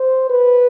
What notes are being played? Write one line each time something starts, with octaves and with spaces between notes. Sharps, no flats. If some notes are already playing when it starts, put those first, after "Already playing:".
Already playing: C5
B4